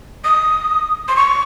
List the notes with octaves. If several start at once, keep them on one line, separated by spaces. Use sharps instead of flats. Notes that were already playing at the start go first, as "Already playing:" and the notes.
D#6
C6
C#6